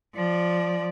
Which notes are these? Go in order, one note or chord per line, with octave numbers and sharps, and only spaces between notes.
F3 D5